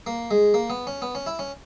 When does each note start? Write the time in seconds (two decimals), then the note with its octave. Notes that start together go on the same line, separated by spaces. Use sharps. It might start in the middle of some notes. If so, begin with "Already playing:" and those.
0.07 A#3
0.31 G#3
0.54 A#3
0.70 B3
0.87 C#4
1.02 B3
1.15 C#4
1.26 E4
1.39 C#4